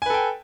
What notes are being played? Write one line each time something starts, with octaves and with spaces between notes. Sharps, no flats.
A4 B4 G5 G#5